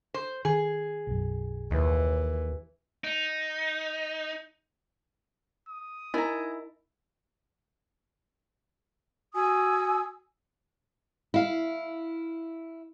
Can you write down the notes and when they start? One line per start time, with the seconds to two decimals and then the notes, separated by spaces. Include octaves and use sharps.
0.14 C5
0.45 D#3 G#4
1.07 B1 F#2
1.71 D#2 E3
3.04 D#4
5.69 D#6
6.14 D#4 E4 A#4 D#5 G#5 A#5
9.34 F#4 G#5 D#6 E6
11.34 E4 F5